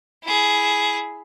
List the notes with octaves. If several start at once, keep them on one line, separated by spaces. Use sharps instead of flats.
E4 G#4